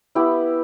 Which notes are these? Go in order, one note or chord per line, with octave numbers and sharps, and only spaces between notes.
B3 E4 G4